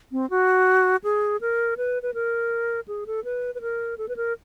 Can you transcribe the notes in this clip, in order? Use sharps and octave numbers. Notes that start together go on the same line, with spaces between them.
C4
F#4
G#4
A#4
B4
B4
A#4
G#4
A4
B4
B4
A#4
A4
B4
A#4